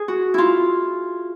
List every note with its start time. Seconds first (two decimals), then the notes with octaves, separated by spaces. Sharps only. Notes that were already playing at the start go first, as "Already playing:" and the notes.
Already playing: G#4
0.08 F#4
0.34 E4 F4